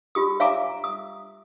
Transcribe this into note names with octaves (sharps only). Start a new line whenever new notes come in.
F4 G4 D#6
C#5 E5 F5 G#5 A#5 D6
D#6